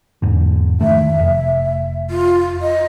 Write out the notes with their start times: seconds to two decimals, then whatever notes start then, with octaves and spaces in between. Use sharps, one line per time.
0.22 E2 G#2 D3
0.81 F2 D#3 A3 E5
1.19 F1
2.10 F4
2.61 D#5